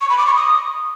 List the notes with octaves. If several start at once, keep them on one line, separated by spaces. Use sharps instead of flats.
C#6
B5
D6
C#6
D#6